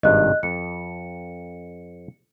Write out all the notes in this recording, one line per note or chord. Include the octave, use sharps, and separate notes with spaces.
G#1 G2 C3 D#5 F#6
F2 C#7